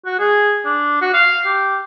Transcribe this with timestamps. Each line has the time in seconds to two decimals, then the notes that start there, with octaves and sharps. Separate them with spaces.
0.06 F#4
0.19 G#4
0.65 D4
1.01 F#4
1.14 F5
1.46 G4